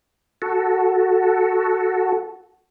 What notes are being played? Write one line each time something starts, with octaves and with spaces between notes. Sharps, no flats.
F#4 A4